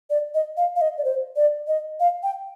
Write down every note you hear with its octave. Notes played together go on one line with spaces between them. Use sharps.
D5
D#5
F5
F5
D#5
D5
C5
D5
D#5
F5
G5